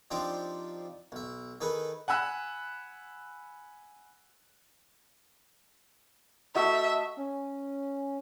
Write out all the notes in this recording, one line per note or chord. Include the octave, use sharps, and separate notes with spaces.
F3 C4 D4 D#4 G4 C5
B1 E5
D#3 D#4 G#4 A4 B4
F#5 G#5 B5 E6 F#6
A3 F#4 D#5 E5
C#4